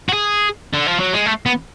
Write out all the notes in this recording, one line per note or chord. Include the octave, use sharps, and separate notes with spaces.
F#4
G#4
D3
F3
F#3
G#3
A3
B3